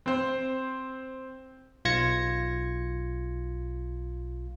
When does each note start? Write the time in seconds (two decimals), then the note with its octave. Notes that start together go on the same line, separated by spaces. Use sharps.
0.06 C4 C5
1.85 B1 F4 G#6 A#6 C#7